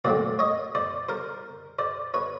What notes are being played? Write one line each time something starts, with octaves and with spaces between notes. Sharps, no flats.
A#2 F#3 A3 C4 C5 D5
C#5 D#5
C5 D5
A#4 C5
C5 D5
B4 C#5